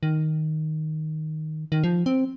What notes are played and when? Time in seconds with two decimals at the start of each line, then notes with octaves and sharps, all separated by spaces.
0.03 D#3
1.72 D#3
1.83 F3
2.06 C4